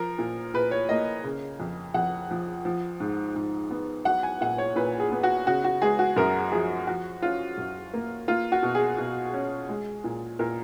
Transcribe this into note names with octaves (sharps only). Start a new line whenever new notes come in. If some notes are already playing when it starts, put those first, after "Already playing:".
Already playing: F3 A#4
A#2
A#2 B4
C#5
A#3 D#5
C#3
F2
F2 F#5
F3
F3
G#2
G#2
B3
F#3 F#5
G#5
A#2 F#5
C#5
A#2 B4
G#4
B3
F#4
C#3 F#4
F#4
G#3 G#4
F#4
F#2 A#4
F3 G#4
F3 F#4
C#4 F4
F#2
A#3
A#3 F4
F#4
B2
G#4
B2
C#4
G#3
A#2
A#2 A#4